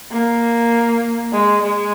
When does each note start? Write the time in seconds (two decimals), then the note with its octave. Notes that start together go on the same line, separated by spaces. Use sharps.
0.12 A#3
1.33 G#3
1.63 G#3